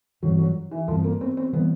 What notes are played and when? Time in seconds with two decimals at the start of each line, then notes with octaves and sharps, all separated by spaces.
0.22 G2 E3 F#3 G3 C4
0.39 F#3
0.71 E3
0.88 G2 E3 F3 G3 C4
1.04 A#3
1.21 C4
1.37 C4
1.53 E3 G3 B3 C4